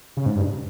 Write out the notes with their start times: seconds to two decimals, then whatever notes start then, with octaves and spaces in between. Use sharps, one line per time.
0.17 C#3
0.26 G#2
0.36 G2